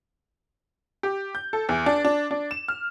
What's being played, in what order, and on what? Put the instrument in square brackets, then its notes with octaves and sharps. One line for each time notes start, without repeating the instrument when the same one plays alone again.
[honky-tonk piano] G4
G6
A4
E2
D4
D4
D4
E7
F6